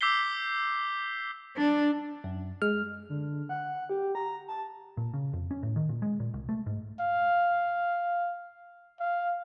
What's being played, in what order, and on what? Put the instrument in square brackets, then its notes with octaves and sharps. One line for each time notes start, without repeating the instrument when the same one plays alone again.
[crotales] D6 E6 G6 B6 C7 G7
[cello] D4
[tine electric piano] F#2
[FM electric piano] G#3 [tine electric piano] F6
[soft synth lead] D3
F#5
G4
A#5
A5
[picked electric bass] A#2
C#3
F2
C#4
A2
D#3
A#2
G#3
A#2
C2
A3
G#2
[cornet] F5
F5